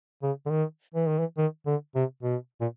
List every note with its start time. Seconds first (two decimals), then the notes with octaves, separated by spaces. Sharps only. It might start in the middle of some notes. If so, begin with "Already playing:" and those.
0.23 C#3
0.46 D3
0.51 D#3
0.94 E3
1.08 D#3
1.19 E3
1.37 D#3
1.67 D3
1.95 C3
2.23 B2
2.61 A#2